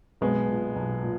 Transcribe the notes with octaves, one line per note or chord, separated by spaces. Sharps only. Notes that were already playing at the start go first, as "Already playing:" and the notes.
B1 G#3 B3
A#2
B1
A#2